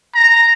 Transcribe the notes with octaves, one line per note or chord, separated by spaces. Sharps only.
A#5